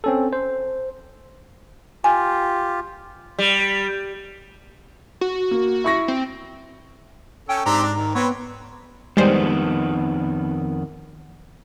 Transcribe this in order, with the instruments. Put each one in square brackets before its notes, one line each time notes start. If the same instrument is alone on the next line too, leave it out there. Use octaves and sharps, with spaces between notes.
[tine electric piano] C4 C#4 A4
C5
[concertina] F4 G4 [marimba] G#5
[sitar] G3
[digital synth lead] F#4
[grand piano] A#3
E4 C#6 A#6
[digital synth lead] C4
[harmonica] C#4 A4 [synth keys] G5
[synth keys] G#2 A#5 [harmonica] C4 D4 G4
[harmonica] D4
D#3
[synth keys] B3 [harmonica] C4 B4 C#5
[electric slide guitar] F2 D#3 B3 [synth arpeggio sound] G3 G#3 C5